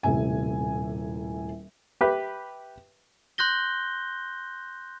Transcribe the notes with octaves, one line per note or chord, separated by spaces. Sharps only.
D#1 A2 C3 G#5
G4 B4 E5
C6 F#6 G6 A#6 G7